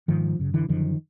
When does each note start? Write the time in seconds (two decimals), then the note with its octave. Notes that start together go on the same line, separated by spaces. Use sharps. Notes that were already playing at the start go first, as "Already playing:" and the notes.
0.08 G#2 D#3 F3
0.39 F#2 C#3
0.54 D3 E3
0.68 F#2 D3 D#3 F3